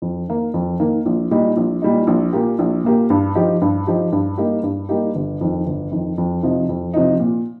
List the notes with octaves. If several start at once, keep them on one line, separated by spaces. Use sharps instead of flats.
F2
D#3 A#3
F2
D#3 A#3
A#1
A#2 G3 D#4
A#1
A#2 G3 D#4
A#1
A#2 A#3 G4
A#1
A#2 A#3 G4
G2
F3 D#4 G4
G2
F3 D#4 G4
G2
G3 A#3 D#4 G4
G2
G3 A#3 D#4 G4
G1
F2 D#3
G1
F2 D#3
F2
C3 F3 D#4
F2
C3 F3 D#4
A#2